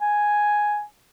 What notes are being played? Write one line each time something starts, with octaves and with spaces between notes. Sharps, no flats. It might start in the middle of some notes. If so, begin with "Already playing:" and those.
G#5